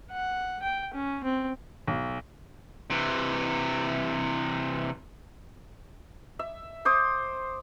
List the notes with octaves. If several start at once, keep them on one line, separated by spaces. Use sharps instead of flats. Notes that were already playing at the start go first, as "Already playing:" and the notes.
F#5
G5
C#4
C4
B1
C3 E3
E5
C5 D6 D#6